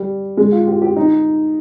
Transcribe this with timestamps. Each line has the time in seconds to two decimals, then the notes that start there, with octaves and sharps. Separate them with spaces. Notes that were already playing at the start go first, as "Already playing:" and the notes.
Already playing: G3
0.37 G#3
0.52 F4
0.67 G4
0.82 G4
0.96 D#4